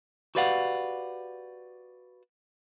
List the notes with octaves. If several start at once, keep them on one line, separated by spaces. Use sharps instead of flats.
F#4 G4 B4 D5 F5 F#5